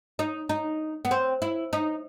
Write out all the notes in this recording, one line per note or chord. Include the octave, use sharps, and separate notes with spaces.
D#4
D#4
B3
C4
E4
D#4